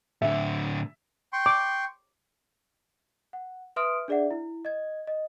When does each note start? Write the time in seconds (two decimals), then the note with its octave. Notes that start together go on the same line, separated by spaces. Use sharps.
0.22 A2 D3 E5
1.33 G5 C6 C#6
1.46 D6
3.33 F#5
3.76 B4 E5 C6 D#6 F6 D7
4.08 D4 G#4 D5 E5 F#5
4.31 E4
4.65 D#5 G#6
5.07 D#5